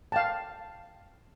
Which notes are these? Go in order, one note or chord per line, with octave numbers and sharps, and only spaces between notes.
F5 G5 A5